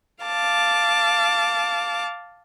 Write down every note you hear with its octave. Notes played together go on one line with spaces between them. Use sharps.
F5 A5 D6